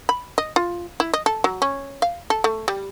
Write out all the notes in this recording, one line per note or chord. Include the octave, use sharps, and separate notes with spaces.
B5
D#5
F4
E4
D#5
A4
F#3
C#4
F5
A4
A3
G3